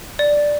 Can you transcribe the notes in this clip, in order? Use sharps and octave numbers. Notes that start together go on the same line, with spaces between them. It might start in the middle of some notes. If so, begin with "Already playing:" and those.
D5